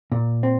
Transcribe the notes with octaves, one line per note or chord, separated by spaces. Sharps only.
A#2
C4